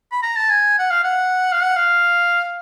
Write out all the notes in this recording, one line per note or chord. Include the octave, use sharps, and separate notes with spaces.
B5
A#5
A5
G#5
F#5
F5
F#5
F5
F#5
F5